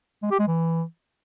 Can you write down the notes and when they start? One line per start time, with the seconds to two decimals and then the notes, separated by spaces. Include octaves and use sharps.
0.23 G#3
0.31 G4
0.39 G#3
0.48 E3